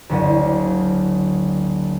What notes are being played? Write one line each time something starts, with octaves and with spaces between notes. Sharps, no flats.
F#1 D2